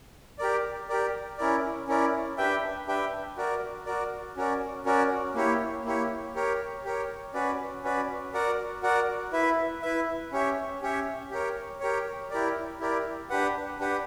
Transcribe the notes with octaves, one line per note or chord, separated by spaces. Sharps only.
G4 A#4 D5
G4 A#4 D5
C#4 E4 A#4 D5
C#4 E4 A#4 D5
D4 G4 B4 E5 G5
D4 G4 B4 E5 G5
F#4 A#4 D5
F#4 A#4 D5
C#4 F#4 A#4 D5
C#4 F#4 A#4 D5
A#3 E4 G4 C#5
A#3 E4 G4 C#5
G4 A#4 C#5
G4 A#4 C#5
C#4 F#4 B4 D5
C#4 F#4 B4 D5
F#4 A#4 D5 F#5
F#4 A#4 D5 F#5
E4 B4 E5
E4 B4 E5
C#4 G4 C#5 E5
C#4 G4 C#5 E5
G4 A#4 C#5
G4 A#4 C#5
E4 G4 A#4 D5
E4 G4 A#4 D5
D4 G4 B4 F#5
D4 G4 B4 F#5